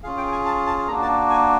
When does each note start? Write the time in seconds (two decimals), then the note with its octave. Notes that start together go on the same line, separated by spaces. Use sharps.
0.03 C#4 F4 G#4 F5
0.17 G5
0.32 G#5
0.46 A5
0.67 A5
0.88 A#3 D4 F#4 A#5
1.02 A5
1.30 G#5